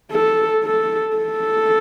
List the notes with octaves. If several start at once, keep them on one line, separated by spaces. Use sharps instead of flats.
A4
A4
A4